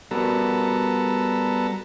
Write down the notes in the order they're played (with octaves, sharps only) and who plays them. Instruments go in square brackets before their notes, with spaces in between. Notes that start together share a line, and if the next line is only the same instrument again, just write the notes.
[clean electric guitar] G3 F#4 A#4 [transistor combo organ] B3 A4 A#5